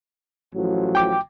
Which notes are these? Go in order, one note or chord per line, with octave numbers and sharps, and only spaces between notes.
A1 F3 F#3
G5 D6